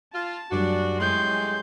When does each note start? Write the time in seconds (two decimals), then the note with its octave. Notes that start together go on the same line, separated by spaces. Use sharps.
0.13 F4 A5
0.51 F#2 G3 A3 D4 F#4
0.99 A2 G#3 C#5 G5 C6 G6